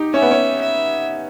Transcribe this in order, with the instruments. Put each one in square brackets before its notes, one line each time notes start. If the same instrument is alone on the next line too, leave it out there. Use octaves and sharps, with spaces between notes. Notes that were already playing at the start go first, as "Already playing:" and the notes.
Already playing: [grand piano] D#4 G4
[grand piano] C#4 [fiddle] E5
[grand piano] B3
C#4
[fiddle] E5